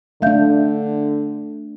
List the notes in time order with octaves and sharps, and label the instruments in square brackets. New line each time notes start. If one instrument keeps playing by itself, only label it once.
[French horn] D3 [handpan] A3 D4 [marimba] E5 F5 G6